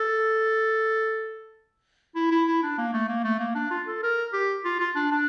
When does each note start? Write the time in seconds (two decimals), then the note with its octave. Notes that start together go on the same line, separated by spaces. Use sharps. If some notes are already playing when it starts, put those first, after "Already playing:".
Already playing: A4
2.16 E4
2.31 E4
2.48 E4
2.63 D4
2.78 A#3
2.94 A3
3.09 A#3
3.25 A3
3.40 A#3
3.55 D4
3.71 F4
3.87 A4
4.03 A#4
4.33 G4
4.65 F4
4.80 F4
4.96 D4
5.11 D4